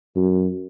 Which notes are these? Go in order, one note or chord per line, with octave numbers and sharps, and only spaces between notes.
F#2